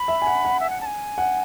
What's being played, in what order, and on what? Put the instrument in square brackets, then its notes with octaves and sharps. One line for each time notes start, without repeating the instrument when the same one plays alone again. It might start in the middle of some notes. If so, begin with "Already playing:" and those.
Already playing: [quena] B5
[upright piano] E5
G#5
F#5
F#5
[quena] E5
F#5
A5
G#5
[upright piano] F#5